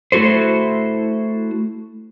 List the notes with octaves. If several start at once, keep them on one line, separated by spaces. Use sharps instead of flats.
A3 E4 F#4 A4 C5